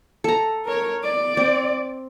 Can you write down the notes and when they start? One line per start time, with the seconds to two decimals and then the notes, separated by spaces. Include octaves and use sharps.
0.24 A4 A#5
0.65 A#4 C#5
1.04 D5
1.37 C4